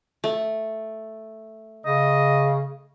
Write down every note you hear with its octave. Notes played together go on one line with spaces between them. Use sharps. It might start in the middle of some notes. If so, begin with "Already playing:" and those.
A3
C#3 D#5